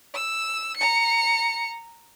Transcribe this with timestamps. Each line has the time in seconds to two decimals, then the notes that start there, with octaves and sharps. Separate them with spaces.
0.14 E6
0.77 A#5 C#7